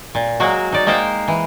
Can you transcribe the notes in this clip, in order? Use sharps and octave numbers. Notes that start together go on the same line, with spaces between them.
A#2
F#3 G#3 A#3 F#4
D#4 D5
G#3 A#3 D#4 A#4 C5 G5
E3